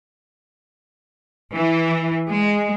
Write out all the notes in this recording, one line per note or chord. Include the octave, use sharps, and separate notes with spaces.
E3
G#3